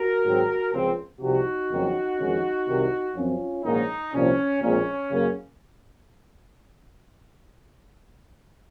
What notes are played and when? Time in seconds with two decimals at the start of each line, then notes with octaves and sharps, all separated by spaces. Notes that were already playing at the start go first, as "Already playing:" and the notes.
Already playing: F#4 A#4
0.24 G#2 D#3 F#3 C4
0.73 C#2 C#3 F3 C4
1.21 C2 C3 F3 D#4 F#4
1.70 F#1 F2 D#3 F#3 C#4
2.18 F2 D#3 G#3 C#4
2.67 C2 C3 D#3
3.15 F#2 F3 C4 C#4 F4
3.64 A#1 G#2 D#3 A#3 C#4 D#4
4.12 C2 A#2 F3 C4 C#4
4.61 A#1 A#2 G#3 C4 C#4
5.10 F#2 C#3 F#3 A#3 C#4